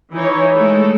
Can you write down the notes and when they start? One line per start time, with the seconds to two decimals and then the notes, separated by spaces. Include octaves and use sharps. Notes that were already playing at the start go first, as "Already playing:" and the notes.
0.12 E3 D#4 C#5
0.53 G#3 A3 A4